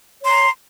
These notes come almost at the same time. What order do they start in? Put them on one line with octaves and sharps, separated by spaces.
C#5 C6 A#5